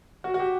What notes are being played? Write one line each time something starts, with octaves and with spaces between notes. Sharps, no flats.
F#4
F#4
G4